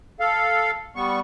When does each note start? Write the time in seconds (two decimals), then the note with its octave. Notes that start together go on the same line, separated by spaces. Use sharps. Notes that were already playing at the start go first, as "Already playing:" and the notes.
0.20 A4 F5
0.96 G3 B3 C#6